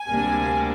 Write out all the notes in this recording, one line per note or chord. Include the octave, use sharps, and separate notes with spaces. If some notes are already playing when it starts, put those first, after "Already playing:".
Already playing: G#5
D2 C3 G3 A#3 D4